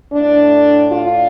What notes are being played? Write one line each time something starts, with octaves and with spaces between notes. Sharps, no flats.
A2 A3 D4
F4